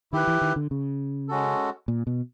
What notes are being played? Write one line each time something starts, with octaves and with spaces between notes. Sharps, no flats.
D#3 E4 G4 B4
E3
D#3
D3
C#3
G#3 C#4 F#4 A4
A#2
B2